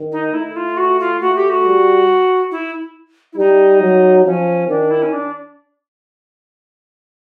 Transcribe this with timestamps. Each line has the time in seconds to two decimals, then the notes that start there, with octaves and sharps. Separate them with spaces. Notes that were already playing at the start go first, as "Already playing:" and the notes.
Already playing: D#3
0.11 D#4
0.33 A3 E4
0.56 F4
0.77 F#4
0.99 F4
1.20 A3 F#4
1.35 G4
1.49 F#4
1.64 G3
2.51 E4
3.32 E4
3.37 G3 D#4
3.81 F#3
4.25 F3 C#4
4.68 D#3 D4
4.90 E4
5.02 C#4
5.12 D4